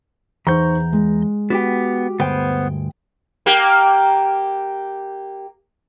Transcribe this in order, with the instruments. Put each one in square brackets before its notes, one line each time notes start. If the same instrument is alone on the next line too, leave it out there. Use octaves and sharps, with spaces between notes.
[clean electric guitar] E2 [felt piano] D#4 C5 C#6 [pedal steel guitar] A#5 G6
[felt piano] G#3
[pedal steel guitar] B3 [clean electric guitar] F#4 G4 G5
[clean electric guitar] D2 G2 G5 [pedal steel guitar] B3 C5
[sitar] A#3 G4